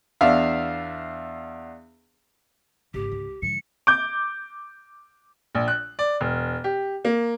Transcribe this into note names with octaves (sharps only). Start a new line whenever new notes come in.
E2 D4 E5 F5
G#1 G#2 C#3 G4
C#2
G#2 D3 F3 C#7
D6 G6
A#1
F#6
D5
E1
G4
A#3